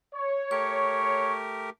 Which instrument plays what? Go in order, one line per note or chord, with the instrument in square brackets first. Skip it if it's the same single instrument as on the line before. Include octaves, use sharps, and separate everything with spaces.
[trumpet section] C#5
[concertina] A3 G4 A#4 [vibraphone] C#6